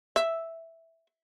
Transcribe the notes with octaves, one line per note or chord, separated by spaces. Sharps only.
E5